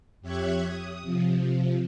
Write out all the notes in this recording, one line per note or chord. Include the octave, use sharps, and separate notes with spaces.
F2 G4 C#5 E5 F#6 G#6
D#6
C3 F3